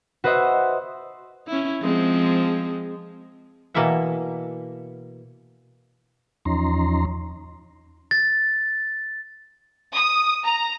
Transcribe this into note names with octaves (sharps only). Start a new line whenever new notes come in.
F#4 B4 C5 D#5 E5
C#4 E4
F3 G#3 C4
B2 E3 A#3 E4 E5 F#5
E2 F3 C#4 D#4 A#5 C6
A6
D#6
A#5